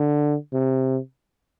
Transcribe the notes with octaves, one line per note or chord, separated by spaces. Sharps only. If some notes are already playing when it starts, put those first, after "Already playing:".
Already playing: D3
C3